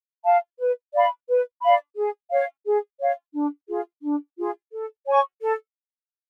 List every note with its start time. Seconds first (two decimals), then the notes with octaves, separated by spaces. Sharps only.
0.24 F5 A5
0.59 B4
0.93 D5 F5 B5
1.28 B4
1.63 D5 F5 B5
1.97 G#4
2.31 C#5 F5
2.65 G#4
3.00 C#5 F5
3.34 D4
3.68 F4 G#4
4.03 D4
4.38 F4 G#4
4.72 A4
5.07 C#5 G#5 C#6
5.41 A4